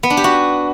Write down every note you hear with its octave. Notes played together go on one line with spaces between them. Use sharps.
B3
D4
G4
F#4